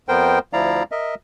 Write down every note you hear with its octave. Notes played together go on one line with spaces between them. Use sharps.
F2 B3 A#4 C5 G5
D2 F3 E4 D5 F5 A#5
A#4 D#5 E5